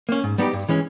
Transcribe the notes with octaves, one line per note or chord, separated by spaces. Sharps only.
A#3 C#4
G#2
G3 B3 D#4 G4
G2
E3 G#3 C#4